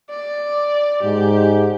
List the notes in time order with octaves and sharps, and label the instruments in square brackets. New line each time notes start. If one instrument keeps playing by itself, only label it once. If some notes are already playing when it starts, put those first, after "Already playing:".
[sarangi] D5
[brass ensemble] G#2 [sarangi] G4